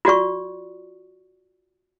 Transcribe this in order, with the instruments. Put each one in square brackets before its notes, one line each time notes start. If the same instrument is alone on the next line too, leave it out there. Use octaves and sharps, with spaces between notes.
[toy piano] F4 F#4 D5 C#6